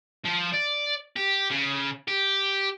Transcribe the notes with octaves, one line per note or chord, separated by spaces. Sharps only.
F3
D5
G4
C#3
G4